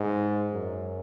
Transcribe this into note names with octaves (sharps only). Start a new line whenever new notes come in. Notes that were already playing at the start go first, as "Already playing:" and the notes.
Already playing: G#2
F#2